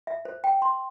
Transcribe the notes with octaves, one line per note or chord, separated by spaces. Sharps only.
E5
C5
G5
C6